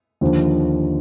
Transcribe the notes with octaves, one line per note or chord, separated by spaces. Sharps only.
D#2 D3 F3